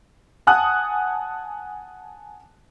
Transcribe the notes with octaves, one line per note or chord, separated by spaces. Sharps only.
F#5 G#5 A5 D#6 F#6